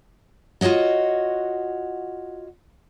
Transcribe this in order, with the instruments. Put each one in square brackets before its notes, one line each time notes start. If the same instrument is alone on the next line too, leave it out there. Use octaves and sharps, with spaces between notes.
[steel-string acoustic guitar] F4 F#4 C#5 D#5 F#5